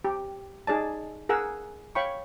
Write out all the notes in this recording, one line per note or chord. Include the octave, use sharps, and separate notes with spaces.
G4
D#4 G#4 D5 A5
G#4 A#4 F#5 E6
C#5 F5 G5 B5 C#6